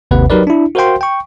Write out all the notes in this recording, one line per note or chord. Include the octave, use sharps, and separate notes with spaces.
G#1 D#2 C3 B4 F#5
F#3 D#4 G4 A#4 B4 D5
D4 E4
F#4 A#4 C5 F5 G5 C6
G5 C#6